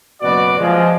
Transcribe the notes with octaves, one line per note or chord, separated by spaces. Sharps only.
F#1 B2 B3 F#4 D5
F3 G#3